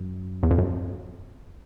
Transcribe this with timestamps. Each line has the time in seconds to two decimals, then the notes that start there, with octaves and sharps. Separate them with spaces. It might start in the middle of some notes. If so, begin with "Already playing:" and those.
Already playing: F#2
0.43 E2
0.51 F2
0.58 F#2